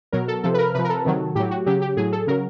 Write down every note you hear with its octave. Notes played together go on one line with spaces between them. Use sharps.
B2 F#3 A#4
A4
C3 F3 A4
B4
A#4
C3 F3 B4
A#4
A4
C3 D#3 F#3
A2 F#3 G4
F#4
C#3 F#3 G4
G4
A2 F#3 G#4
A4
C#3 F#3 A#4